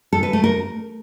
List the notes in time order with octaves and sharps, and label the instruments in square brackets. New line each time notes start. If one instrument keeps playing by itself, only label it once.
[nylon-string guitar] A4
B4
A3
A#4